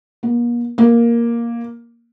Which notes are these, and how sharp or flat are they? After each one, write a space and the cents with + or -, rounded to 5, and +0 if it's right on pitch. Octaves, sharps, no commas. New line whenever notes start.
A#3 +40
A#3 +5